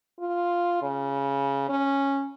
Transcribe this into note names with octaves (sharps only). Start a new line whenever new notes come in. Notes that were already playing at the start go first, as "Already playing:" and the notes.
F4
C#3
C#4